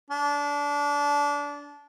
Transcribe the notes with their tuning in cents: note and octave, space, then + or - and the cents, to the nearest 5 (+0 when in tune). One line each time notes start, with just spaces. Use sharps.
D4 -25